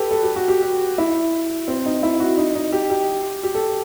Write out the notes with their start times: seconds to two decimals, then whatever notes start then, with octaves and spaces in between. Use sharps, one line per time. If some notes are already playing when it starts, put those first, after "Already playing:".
Already playing: G4 A4 B4
0.11 A4
0.23 G4
0.36 F#4
0.48 G4
0.63 G4
0.98 E4
1.68 C4
1.86 D#4
2.03 E4
2.20 F#4
2.38 D#4
2.55 D#4
2.73 G4
2.90 G4
3.43 G4
3.55 A4